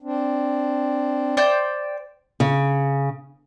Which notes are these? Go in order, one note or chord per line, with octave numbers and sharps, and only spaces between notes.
C4 D4
C5 D5 G5
C#3